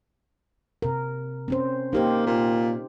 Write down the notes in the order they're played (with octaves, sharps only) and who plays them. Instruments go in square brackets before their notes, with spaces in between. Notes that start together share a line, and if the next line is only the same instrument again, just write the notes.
[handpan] C3 A#4
C4 C#4 C5
[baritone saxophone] A#3 [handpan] D#4 G4 C5
[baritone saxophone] A#2